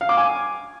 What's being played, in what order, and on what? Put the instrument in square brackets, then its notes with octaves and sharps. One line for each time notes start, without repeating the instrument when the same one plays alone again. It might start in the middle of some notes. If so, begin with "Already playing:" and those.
[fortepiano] F5
D6
G#5